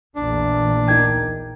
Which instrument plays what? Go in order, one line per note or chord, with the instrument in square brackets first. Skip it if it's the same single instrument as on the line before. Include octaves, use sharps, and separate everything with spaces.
[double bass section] A#1 E2 A#2 [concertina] D4
[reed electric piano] D2 G#6 [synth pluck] D#4 A#4 G5